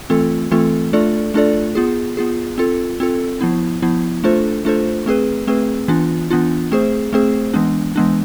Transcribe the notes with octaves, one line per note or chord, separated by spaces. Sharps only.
E3 A3 C4 F4 A4
E3 A3 C4 F4 A4
A3 D4 F4 A4 D5
A3 D4 F4 A4 D5
B3 F4 G#4
B3 F4 G#4
C4 F4 A4
C4 F4 A4
F3 B3 E4
F3 B3 E4
A3 D4 F4 A4 C5
A3 D4 F4 A4 C5
A3 C4 G#4 B4
A3 C4 G#4 B4
E3 B3 D4 F4
E3 B3 D4 F4
A3 C4 G#4 C5
A3 C4 G#4 C5
E3 G#3 B3 D4
E3 G#3 B3 D4